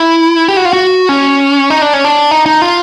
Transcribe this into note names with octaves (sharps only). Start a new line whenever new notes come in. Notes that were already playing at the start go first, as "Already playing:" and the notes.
Already playing: E4
G4
F#4
F4
F#4
C#4
D#4
D4
C#4
D4
D#4
D#4
F4